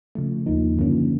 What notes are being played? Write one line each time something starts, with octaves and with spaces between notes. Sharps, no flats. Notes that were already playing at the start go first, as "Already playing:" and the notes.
C#3 F3 A3
D#2 C#3 F3 A#3 D#4
F#2 D3 F3 A#3 C#4